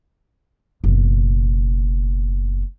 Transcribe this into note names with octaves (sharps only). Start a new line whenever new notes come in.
F#1 B2